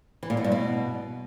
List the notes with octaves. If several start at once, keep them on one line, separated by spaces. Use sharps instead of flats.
E3
A#2
B2
G2
B2